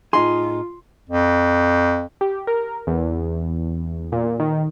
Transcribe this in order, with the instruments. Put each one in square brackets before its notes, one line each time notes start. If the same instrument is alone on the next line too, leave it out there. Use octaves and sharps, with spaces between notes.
[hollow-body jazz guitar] A2 D#4 G#4 [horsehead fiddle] F4 [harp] C6
[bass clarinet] F2
[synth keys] G4
A#4
E2
A#2
D#3